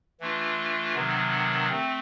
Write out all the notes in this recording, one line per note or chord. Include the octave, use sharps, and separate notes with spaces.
E3 A3 D4 F4
C3 D#3 F#3 B3 D4
A3 C4